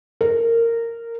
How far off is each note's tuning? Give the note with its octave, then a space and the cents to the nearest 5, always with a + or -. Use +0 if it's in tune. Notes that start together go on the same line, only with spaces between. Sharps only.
A#4 -15